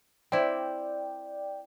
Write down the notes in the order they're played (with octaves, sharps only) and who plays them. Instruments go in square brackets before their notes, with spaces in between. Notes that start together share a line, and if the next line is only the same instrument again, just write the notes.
[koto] C4 E4 [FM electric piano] D5 G5